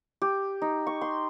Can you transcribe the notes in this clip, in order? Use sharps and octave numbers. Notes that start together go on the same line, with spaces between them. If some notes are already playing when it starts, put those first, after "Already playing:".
G4
D#4
C#6
C6